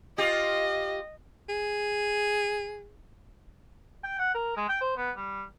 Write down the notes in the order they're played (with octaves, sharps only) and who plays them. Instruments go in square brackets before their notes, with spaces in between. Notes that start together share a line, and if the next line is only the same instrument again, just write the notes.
[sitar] F4 G4 [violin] D#5
[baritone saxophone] G#4
[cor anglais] G5
F#5
A#4
G#3
G5
C5
B3
G3